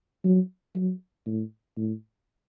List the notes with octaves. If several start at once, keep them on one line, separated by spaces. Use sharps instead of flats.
F#3
F#3
A2
A2